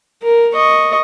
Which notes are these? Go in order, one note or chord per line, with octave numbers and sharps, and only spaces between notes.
A#4
D#5 C#6